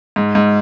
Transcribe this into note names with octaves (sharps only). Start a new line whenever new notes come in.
G#2
G#2